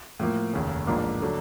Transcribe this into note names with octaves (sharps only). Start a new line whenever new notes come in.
A2 F3 A#3
F1 D#2 C#3
A1 G#2 F3 A#3 D4
D3 F#3 A3 D4